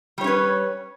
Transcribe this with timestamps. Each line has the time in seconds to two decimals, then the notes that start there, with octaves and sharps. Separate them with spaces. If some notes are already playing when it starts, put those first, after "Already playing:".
0.18 G3
0.21 C#5
0.24 C#4
0.27 B4